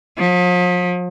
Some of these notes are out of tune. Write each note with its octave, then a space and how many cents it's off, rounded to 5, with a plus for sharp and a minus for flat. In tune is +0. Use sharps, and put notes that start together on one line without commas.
F3 +40